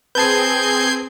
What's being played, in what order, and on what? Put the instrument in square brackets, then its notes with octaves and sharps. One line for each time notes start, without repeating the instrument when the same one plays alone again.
[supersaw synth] C4 G#4 [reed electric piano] B4 A5 [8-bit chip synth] G6 G#6 C7